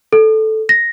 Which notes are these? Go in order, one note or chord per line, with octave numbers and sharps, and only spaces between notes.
A4
A#6